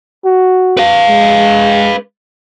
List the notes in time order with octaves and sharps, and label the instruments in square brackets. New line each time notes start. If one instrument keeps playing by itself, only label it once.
[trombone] F#4
[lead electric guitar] B4 F5
[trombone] G#3